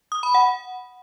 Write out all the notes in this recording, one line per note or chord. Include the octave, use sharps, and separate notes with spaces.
D#6
B5
F#5